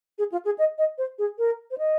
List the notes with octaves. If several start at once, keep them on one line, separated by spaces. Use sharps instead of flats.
G#4
F4
G#4
D#5
D#5
C5
G#4
A#4
C5
D#5